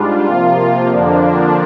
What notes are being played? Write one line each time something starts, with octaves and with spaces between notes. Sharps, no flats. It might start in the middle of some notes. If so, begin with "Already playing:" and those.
Already playing: G#2 G3 D4 F4
C3 F3 A#3 F4
F2 D3 F3 A#3 D4